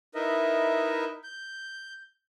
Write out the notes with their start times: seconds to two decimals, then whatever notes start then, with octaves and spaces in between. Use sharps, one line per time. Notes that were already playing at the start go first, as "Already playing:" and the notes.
0.15 D#4 E4 A#4 B4 D#5 E5
1.24 G6